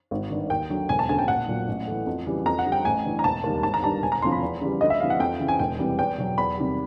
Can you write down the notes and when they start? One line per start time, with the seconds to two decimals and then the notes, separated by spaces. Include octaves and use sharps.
0.11 G#1
0.30 G2 D#3
0.50 D#2 G5
0.70 D3 F#3
0.89 E1 G#5
0.99 A5
1.09 D2 C#3 G#5
1.19 G5
1.28 A#1 F#5
1.48 A#2 F#3
1.68 A1
1.87 A2 E3
2.07 F2
2.26 C#3 E3 G3
2.46 F2 A#5
2.59 F#5
2.66 D3 G3
2.72 G5
2.85 A1 G#5
3.05 G2 E3
3.19 A#5
3.24 E1 A5
3.44 D#2 D#3 G3
3.63 G#1 A5
3.74 A#5
3.83 G2 D#3 G3 A5
4.02 E1 G#5
4.12 A#5
4.22 D2 C3 F3 C6
4.32 B5
4.42 E2
4.61 C#3 E3 G3
4.81 D2 D#5
4.90 E5
5.00 C3 E3 G3 F5
5.10 F#5
5.20 F2 G5
5.40 C#3 E3
5.48 G#5
5.59 E1 G5
5.79 E2 C3 E3 G3
5.99 E2 G5
6.18 B2 F#3
6.37 E2 B5
6.57 C3 D#3 G3